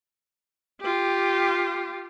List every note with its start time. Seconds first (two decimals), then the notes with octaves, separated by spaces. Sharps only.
0.81 F4 G4